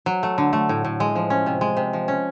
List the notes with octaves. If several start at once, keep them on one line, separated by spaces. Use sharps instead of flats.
F#3
A3
D3
A3
A2
A2
G#3
F3
C#4
C3
G#3
C3
F3
C#4